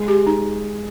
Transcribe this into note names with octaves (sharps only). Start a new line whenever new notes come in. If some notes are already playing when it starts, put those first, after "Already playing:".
Already playing: G#3
G4
D#4